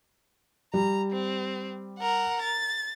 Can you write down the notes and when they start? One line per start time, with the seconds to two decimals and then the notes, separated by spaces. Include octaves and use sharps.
0.74 G3 A#5
1.13 C4
1.99 A#4 F#5
2.42 A6